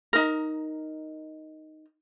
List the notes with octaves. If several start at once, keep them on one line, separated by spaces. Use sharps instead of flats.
D#4 A#4